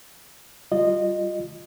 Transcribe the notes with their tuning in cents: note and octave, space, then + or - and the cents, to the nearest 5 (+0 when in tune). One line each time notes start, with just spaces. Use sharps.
G3 -20 F4 +10 D#5 -20